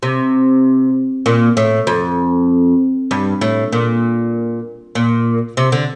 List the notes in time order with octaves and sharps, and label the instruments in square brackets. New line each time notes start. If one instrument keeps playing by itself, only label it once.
[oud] C3
A#2
A2
F2
G2
A2
A#2
A#2
C3
D3